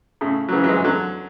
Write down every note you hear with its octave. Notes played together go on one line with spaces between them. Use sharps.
A2 C#3
F#3
C#3 E3
F#3
E3 G#3
D3 F#3